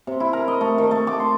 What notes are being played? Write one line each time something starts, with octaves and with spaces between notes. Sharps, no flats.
C3
E4
A#4
D#5
A3
D#3
A3
D6
C6